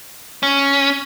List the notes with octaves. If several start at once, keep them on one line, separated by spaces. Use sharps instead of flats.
C#4